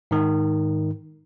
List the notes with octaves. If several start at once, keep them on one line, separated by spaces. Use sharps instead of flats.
G#2 D#3